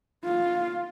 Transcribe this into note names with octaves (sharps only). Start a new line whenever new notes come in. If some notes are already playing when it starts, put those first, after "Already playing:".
F4